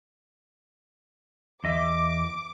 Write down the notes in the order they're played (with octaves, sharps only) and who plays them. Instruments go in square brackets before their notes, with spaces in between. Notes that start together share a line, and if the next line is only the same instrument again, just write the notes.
[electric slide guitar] E2 D#5 E5 [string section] D6